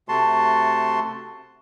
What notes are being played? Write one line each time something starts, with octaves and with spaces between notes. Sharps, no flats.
C3 A3 F#4 A5 C6